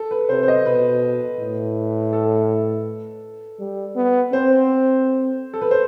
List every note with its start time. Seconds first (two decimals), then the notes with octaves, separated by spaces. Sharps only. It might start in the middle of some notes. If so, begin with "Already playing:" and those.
Already playing: A4
0.11 B4
0.29 C3 C5
0.43 C5
0.48 D#5
0.65 B2 B4
1.39 A2
2.13 A4
3.59 G3
3.96 B3
4.32 C4 C5
5.53 A4
5.61 B4
5.71 C5